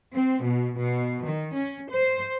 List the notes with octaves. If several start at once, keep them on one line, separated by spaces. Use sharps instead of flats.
C4
B2
B2
D#3
C#4
C5